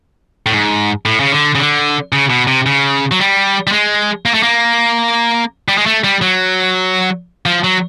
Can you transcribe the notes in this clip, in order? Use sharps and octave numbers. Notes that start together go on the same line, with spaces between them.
A2
G#2
A2
C#3
D3
C#3
D3
C#3
B2
C3
C#3
F#3
G3
G3
G#3
A#3
A3
A#3
G3
G#3
A3
G3
F#3
F3
F#3